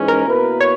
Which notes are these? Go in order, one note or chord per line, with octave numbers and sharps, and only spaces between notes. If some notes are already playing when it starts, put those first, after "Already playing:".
Already playing: G#2 E3 G#3 C#4
A#4
B2 A#3 E4 B4
C#5